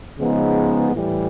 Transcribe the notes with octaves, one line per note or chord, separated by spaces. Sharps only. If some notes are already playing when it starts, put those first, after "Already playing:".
C#3 F3 G#3 B3 D#4
A2 E3 G3